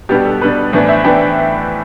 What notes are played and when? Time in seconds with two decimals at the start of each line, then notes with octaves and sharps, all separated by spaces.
0.09 B2 G3 B3 D4 G4
0.25 A4
0.41 B2 G3 B3 D4 B4
0.73 A2 E3 B3 D4 C5
0.89 E5
1.04 A2 E3 B3 D4 G5